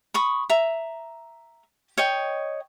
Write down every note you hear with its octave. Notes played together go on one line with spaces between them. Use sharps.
B5 C#6 D#6
E5 A#5
C#5 D#5 G5